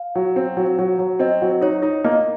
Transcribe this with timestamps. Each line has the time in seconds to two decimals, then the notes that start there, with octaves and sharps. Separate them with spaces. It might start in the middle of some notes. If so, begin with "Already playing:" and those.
Already playing: F5
0.15 F#3
0.36 C4
0.57 F#3
0.79 F#3
0.99 F#3
1.19 C4 D#5
1.42 F#3
1.61 D#4 C#5
1.82 D#4
2.05 A#3 D#5